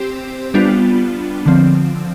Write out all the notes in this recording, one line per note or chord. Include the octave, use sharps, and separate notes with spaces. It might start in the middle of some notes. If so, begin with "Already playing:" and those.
Already playing: C4 G4 C5
G3 B3 D4 F4
D3 F3 C4